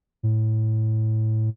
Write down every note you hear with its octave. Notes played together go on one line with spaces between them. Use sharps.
A2